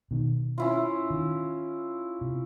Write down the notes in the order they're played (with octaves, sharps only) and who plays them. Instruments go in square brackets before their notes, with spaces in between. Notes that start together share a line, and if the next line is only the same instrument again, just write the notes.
[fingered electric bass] B2 D#3
[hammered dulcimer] C#4 E4 F4
[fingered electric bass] D#3
C3